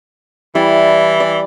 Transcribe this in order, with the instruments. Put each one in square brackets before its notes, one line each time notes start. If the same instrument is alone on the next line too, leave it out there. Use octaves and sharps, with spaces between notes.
[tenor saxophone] E3 [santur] G3 E4 D5
[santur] D5